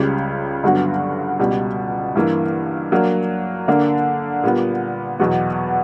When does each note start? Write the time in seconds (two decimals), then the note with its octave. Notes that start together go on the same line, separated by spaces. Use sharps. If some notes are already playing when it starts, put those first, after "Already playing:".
Already playing: C#2 C#3 G3
0.64 G2 D3 F#3 B3 F#4
1.39 C#2 B2 G3
2.16 G2 E3 A#3
2.92 F#3 A#3 D4
3.68 D3 A#3 D4
4.43 A#2 G3 B3
5.20 E2 B2 F#3 B3 F#4